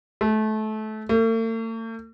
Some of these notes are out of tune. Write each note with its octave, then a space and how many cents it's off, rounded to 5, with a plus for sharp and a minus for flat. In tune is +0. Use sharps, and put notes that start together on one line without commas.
A3 -25
A3 +45